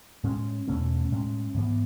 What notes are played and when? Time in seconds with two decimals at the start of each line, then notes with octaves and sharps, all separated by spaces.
0.24 A2 G#3 C#4
0.68 E2 B2 A3 C#4
1.12 A2 G#3 C#4
1.54 G#2 E3 B3